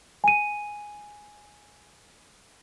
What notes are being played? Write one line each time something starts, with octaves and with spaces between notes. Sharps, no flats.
G#5 D#7